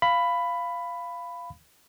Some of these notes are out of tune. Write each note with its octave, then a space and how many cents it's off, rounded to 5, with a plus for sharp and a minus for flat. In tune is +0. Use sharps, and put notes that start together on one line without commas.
F5 -10 B5 +10